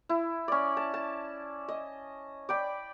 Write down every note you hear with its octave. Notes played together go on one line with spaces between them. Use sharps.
E4
C#4 D5
A5
A5
D#5
D5 G5 B5